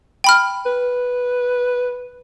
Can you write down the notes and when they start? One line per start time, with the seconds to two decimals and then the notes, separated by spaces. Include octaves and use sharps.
0.24 G5 B5 F6
0.66 B4